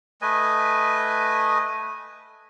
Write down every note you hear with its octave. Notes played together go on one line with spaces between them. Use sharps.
A3 B4 D#5 G#5